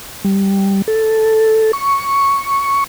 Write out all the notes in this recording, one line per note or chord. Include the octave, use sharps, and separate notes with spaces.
G3
A4
C#6